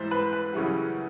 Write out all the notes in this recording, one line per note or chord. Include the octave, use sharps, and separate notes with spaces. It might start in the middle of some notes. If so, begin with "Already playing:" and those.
Already playing: G#2 E3 G3 C5 E5
B4
B4
F#2 C#3 E3 G3